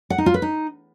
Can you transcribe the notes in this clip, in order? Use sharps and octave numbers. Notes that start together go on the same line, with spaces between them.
F#5
D#4
F4
B4
D#4